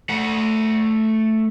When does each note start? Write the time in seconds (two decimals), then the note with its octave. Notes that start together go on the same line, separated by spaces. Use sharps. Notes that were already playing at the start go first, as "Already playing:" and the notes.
0.09 A3 F#5